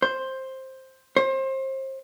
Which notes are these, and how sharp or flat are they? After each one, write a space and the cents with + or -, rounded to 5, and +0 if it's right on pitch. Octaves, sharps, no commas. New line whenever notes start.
C5 +10
C5 +30